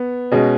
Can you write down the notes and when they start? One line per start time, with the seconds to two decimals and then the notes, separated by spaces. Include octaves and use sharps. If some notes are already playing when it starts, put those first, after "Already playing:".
Already playing: B3
0.32 B2 G#3 C#4